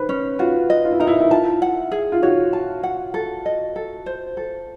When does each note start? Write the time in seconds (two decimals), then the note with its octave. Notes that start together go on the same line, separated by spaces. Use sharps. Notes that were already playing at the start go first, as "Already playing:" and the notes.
Already playing: B4 C5
0.09 C#4
0.39 F4 F#4
0.70 D#5
0.85 F4
0.92 E4
1.00 D#4 A#4
1.07 E4
1.20 E4
1.31 F4 A5
1.62 F#5
1.92 G#4
2.12 F4
2.23 F#4 C#5
2.53 A5
2.83 F#5
3.14 A4
3.46 D#5
3.76 A4
4.06 C5
4.37 A4